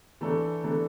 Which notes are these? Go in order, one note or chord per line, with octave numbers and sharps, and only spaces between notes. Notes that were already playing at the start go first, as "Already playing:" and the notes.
E3 A3 D4 A4
E3 A3 D4 A4